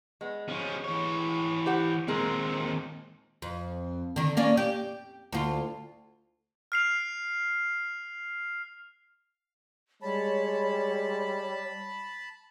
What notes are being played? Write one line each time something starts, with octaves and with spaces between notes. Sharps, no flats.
G#3 B3
F3 C#4
E3 C#5
G4 C5 F#5
D#2 A#2 G#3 C4 A#4
F2
D3 D#3
A#3 C#4 D5
G4
D2 F4
F6 C7 F7
G3 G#3 C#5 A5 B5